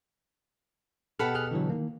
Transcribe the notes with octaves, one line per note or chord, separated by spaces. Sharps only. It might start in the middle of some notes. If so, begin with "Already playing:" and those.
B2 G4 A4 F#5 B5 F6
G#4 F6 F#6
D3 E3 F#3
D#3 A#3